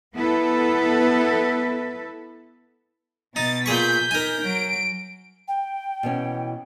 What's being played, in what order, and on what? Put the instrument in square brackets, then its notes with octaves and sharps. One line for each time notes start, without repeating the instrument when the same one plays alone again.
[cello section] B3 E4 A4 B4
[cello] B2 [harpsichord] D#4 [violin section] A6
[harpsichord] A#2 G#4 C#6 [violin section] G6 B6
[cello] D#4 [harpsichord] A#4 G#5
[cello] F#3 [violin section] D7
[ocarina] G5
[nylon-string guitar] B2 E3 C#4